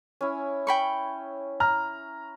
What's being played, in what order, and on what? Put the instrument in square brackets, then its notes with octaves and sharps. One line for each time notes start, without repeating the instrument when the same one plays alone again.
[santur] C#4 E4
[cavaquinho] G5 B5 C#6
[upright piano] A#5 F6